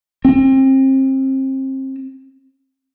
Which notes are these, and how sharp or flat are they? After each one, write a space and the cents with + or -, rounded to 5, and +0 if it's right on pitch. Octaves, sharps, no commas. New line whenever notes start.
C4 +30